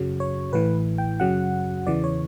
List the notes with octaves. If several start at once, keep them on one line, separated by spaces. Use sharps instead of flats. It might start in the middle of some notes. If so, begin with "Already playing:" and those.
Already playing: F#2 C#3 F#3
C#5
A1 A2 E3 B4
G5
F#2 C#3 F#3 F#5
E2 C#3 E3 D5
C#5